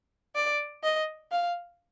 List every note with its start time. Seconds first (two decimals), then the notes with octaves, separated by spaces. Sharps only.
0.36 D5
0.84 D#5
1.31 F5